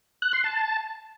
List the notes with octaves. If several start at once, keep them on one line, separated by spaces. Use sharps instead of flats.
F#6
C6
A5